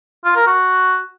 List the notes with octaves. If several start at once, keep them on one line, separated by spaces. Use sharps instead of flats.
F4
A#4
F#4